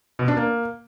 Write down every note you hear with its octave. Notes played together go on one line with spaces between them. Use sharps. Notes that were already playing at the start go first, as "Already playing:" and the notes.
B2
D4
A#3